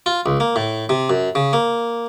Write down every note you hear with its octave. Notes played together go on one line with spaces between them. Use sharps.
F4
C#2
A#3
A2
C3
F#2
C#3
A#3